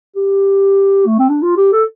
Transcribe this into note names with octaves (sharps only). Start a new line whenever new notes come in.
G4
A3
C4
D4
F4
G4
A4